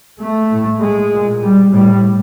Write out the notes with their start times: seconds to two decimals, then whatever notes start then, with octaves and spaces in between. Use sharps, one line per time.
0.19 A3
0.50 A2
0.80 G#3
1.11 A#2
1.42 G3
1.73 A2 G3